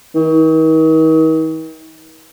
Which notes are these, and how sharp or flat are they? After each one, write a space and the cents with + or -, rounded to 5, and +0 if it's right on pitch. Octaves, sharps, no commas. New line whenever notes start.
D#3 +40